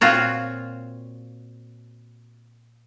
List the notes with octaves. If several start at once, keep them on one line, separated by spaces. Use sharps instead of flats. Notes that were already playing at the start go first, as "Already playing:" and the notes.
A#2 C4 F4 F#4 C#5